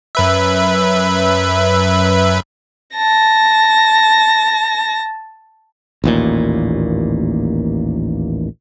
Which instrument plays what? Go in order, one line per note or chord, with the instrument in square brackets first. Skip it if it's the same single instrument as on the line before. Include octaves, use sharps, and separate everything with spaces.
[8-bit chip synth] F#2 B4 E5
[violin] A5 A#6
[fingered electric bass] A1 D#2 A#2